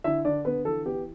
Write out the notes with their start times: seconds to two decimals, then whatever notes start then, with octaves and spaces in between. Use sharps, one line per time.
0.04 D3 E4 E5
0.25 D3 D4 D5
0.45 D3 B3 B4
0.65 E3 A4
0.86 B3 G4